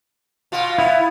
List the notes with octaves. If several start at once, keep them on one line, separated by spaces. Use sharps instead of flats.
B2 F4
B3 E4